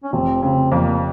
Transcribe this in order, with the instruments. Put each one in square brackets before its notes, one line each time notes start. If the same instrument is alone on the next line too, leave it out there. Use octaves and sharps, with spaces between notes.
[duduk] C#4
[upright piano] F1 [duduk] C4
[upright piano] C#3 [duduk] C4
[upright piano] F2 [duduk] A#3